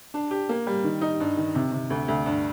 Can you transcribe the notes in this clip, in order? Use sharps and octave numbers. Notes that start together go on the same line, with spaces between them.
D4
G4
A#3
G3
D#3
D#4
G2
D#3
C3
C3
D2
D2
G2